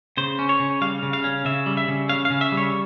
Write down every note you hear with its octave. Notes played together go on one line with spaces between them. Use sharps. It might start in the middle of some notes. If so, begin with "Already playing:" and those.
C#3 C5
C#4
C#5
C#3
G3 F5
C#3
F5
C#4
C#3 E5
G3
E5
C#3
C#4 F5
F5
C#3
E5
G3
C#5